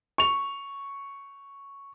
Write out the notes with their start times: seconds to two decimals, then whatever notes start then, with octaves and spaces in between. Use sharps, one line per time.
0.18 C#6 F7